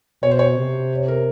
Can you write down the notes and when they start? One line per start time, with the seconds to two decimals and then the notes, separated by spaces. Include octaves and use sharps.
0.23 B2 C#5
0.31 C5
0.39 C#5
0.57 C3
1.08 A#4